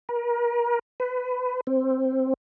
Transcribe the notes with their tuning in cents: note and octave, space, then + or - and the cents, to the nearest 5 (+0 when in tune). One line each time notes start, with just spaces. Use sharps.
A#4 +35
B4 +25
C4 +5